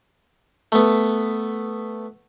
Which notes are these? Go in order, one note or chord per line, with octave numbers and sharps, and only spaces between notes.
A3 B3